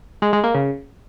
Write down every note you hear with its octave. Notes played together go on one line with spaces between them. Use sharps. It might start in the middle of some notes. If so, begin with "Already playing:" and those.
G#3
G#3
A#3
C#3